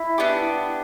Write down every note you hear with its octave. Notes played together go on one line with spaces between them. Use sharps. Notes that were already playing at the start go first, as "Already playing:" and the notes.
Already playing: E4
B3 D4 G4